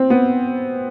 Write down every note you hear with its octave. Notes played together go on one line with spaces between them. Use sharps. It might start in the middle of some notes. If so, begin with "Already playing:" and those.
Already playing: C4
B3